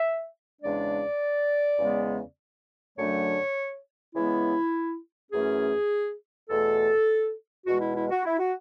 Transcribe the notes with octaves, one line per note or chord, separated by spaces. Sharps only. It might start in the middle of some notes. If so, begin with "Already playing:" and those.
Already playing: E5
E2 C#3 G#3 D4 D5
E2 C#3 G#3 B3
F#2 D3 F#3 A3 D4 C#5
C#3 E3 G#3 B3 E4
F#2 E3 A3 C#4 G#4
E2 B2 A3 A4
E2 B2 G#3 F#4
E4
E4
F#4
E4
F#4